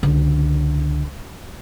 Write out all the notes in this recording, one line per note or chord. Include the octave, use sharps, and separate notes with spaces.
C#2 D3